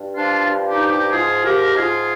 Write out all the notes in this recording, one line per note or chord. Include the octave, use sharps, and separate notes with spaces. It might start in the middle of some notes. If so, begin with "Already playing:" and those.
Already playing: G2
F3 D4 F4
G2
D#4 G4
F3
D#4 G4
G#2 F4 G#4
F3 G4 A#4
G#2 F4 G#4